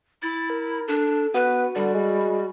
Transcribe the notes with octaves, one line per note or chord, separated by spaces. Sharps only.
E4 A6
A#4
D4 A4
B3 F#4 B4
D3 G3
G#3